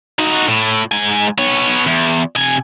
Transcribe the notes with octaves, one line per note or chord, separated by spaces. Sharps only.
D#4 F#4
A2
G#2 G#5
B3 C#5
E2
C3 G#5